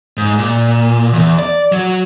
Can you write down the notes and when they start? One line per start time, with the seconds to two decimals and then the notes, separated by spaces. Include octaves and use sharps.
0.17 G#2
0.38 A#2
1.13 E2
1.39 D5
1.72 F#3